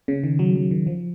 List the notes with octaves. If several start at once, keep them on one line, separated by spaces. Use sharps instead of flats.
C#3
D#3
F#3
F#3
D#3
F3